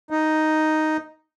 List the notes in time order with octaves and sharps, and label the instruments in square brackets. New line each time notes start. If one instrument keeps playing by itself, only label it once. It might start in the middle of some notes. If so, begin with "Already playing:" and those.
[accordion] D#4